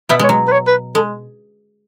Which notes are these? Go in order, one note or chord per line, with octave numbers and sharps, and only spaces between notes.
B2 B3 E5
G#3 C#5
F#3
B4
C#5
B4
G#3 A4